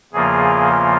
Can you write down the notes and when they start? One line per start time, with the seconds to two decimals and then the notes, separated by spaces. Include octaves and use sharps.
0.13 E2 C#3 F3 A#3 F4 G#4